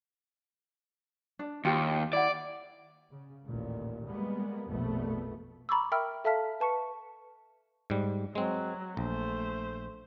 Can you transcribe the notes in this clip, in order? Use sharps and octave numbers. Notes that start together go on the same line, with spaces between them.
D4
D#2 F4 G4
E4 D5 F#5
C#3
A1 D#2 A#2
G3 G#3 A#3 B3
A#1 F2 B2 A3 B3
A#5 B5 C#6 D6 E6
A#4 E5 G5 B5 E6 F6
A4 E5 F5 A5 F6 B6
B4 A5 C#6 C#7
G#2 G3
F#3 G#3 C4
A#1 A3 C5